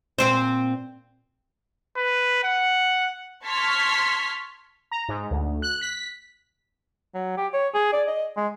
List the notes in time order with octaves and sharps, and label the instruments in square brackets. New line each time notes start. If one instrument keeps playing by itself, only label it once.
[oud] A#2 C4 C5
[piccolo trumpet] B4
F#5
[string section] A5 C6 C#6 F6 G#6 B6
[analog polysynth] A#5
G#2
D2
F#6
B6
[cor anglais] F#3
G4
C#5
G#4
D5
D#5
G#3